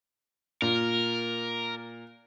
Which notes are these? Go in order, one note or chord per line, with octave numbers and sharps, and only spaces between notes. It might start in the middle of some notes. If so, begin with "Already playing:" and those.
A#2 A#4